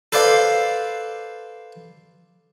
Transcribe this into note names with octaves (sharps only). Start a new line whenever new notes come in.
A4 B4 C5 D5 F5